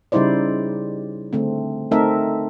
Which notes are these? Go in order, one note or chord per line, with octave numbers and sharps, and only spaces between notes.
C#3 G3 D#4 E4 C5 D5
D3 A3 C4
A3 C4 D#4 A4 A#4 E5